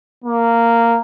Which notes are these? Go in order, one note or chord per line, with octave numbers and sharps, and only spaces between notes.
A#3